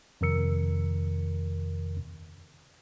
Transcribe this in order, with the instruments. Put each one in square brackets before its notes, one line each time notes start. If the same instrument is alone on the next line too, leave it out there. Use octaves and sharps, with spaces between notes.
[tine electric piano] F2 C3 D#3 A#4 E6 C#7